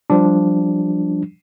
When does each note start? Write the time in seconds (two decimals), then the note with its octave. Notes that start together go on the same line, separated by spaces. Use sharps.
0.10 F3 G3 D4